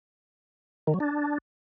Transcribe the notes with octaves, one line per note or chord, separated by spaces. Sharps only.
D#3
F#3
D4